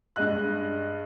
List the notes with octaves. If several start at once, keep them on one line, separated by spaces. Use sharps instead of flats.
G2 G#3 D#5 F#6